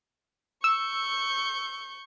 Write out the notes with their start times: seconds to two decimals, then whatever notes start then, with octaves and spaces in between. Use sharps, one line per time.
0.64 C#6 E6 G6